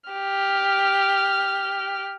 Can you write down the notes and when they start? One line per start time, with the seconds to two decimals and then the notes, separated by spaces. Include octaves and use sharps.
0.10 G4 F6